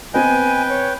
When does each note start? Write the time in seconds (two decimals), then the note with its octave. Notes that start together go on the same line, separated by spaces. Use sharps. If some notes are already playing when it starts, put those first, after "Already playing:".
0.14 B3 C4 B4 D#5 G5 G#5
0.69 C#5